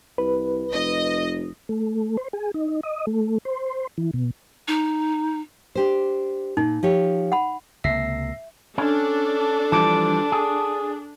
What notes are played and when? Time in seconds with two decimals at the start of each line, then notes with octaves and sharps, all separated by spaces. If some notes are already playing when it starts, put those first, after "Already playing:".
0.18 C2 B4
0.74 F1 D#5
1.69 A3
2.17 C5
2.33 G#4
2.54 D#4
2.83 D#5
3.07 A3
3.45 C5
3.98 E3
4.14 B2
4.68 D#4
5.75 D4 G4 C5
6.57 A#2 D#4
6.83 F3 G4 C#5
7.32 F#5 B5
7.84 C#2 C3 A#3 E5 E6 A#6 C7
8.78 C#4 D4 A4
9.72 E3 F3 G3 A5 D6 D7
10.32 G#4